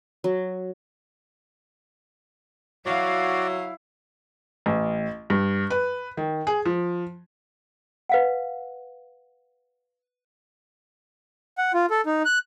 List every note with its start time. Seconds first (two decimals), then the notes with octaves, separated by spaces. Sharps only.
0.24 F#3
2.86 F#3 E4 F#4 D5 F5
4.66 A1
5.30 G2
5.70 B4
6.17 D#3
6.47 G#4
6.65 F3
8.09 B4 F5 F#5
11.58 F#5
11.74 F4
11.90 A4
12.06 D#4
12.25 F#6